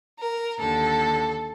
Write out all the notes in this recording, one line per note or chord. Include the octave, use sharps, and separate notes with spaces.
A#4
D#2 D3 A4